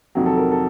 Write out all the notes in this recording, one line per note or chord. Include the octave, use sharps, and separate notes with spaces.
F2 C3 D#3 F#3
A4
A#4
A4